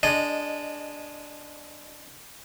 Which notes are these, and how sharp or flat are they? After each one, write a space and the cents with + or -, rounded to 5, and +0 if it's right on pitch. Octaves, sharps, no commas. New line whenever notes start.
G#3 +0 D4 +0 D#5 -15